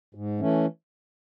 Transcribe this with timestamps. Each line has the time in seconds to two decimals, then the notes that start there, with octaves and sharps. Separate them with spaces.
0.15 G#2
0.40 E3 A3 C#4